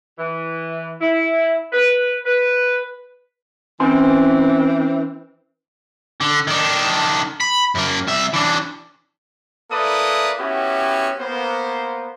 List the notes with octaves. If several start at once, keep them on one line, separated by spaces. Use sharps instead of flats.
E3
E4
B4
B4
E3 C4 C#4 G#5 C6
D3
D#3 D4
B5
F#2 A#3
C2 E5
E3 D4
A#3 E4 A4 B4 D5 D#6
B3 C#4 E4 F#4 G4
A#3 B3 C5